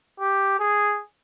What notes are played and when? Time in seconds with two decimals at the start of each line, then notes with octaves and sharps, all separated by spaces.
0.20 G4
0.59 G#4